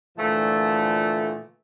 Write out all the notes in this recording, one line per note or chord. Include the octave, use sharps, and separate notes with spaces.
A#2 D3 E3 F3 A3